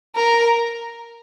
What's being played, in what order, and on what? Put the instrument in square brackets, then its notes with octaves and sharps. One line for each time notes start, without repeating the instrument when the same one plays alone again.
[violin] A#4